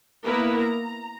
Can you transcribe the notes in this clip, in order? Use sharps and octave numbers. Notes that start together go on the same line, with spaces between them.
A#3 B3 E4 A#4 B4
A#5